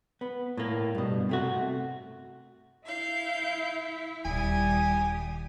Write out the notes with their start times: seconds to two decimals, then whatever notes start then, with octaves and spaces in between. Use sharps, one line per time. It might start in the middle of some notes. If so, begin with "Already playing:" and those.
0.21 B3
0.57 A2 A#3
0.95 G2 B2
1.29 C3 A3 F#4
2.85 E4 F5 G6
4.25 D#1 D#3 G3 G4 G#5 D#6